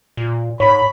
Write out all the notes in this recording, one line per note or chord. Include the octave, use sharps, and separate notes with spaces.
A#2
G#2 C#5 B5